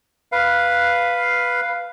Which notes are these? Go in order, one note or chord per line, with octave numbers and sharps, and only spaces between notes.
B4 F5